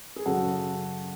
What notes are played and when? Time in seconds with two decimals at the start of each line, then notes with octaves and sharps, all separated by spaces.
0.16 G#4
0.26 F#2 C#3 F#4 A4